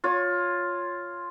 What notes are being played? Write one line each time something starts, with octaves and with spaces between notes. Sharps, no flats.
F4 C#5